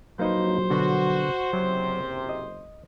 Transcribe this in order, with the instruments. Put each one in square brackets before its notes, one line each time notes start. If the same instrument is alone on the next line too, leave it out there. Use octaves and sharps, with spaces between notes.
[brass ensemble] A#1 F#3 [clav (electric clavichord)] A#3 D#4 B4 [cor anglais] C5
[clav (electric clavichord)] B2 D3 B3 [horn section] F#4
[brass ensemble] F#1 [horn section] C3 [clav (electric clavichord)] F#3
[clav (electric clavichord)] D#5